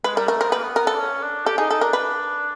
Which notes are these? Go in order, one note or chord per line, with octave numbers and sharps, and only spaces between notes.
G#3 B4
G3 A#4
A3 A#4
C4 A#4
B3
A#3 B4
B3
A#4
A4
D4
C#4
D4
G4 A4
D#4 G#4
D#4 A4
D4 A#4
B4